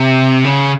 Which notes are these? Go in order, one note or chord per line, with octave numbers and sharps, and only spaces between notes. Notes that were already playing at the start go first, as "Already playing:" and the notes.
Already playing: C3
C#3